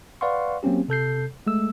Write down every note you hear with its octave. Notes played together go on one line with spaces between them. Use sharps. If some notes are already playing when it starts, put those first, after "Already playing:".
B4 D5 F5 F#5 C6 C#6
F#3 A#3 C4 C#4 G4
C3 A4 G6 C7
G#3 A3 E6